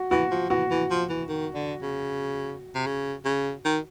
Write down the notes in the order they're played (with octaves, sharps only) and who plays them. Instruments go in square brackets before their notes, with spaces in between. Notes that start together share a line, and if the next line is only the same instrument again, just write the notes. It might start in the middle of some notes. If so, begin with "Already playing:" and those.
Already playing: [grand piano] F#4
[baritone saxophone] E3 [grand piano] F#4
[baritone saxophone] F3
[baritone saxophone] E3 [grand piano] F#4
[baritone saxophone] E3
F3
E3
D#3
D3
C#3
C3
C#3
C#3
D#3